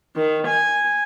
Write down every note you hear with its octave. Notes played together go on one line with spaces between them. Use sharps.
D#3
G#5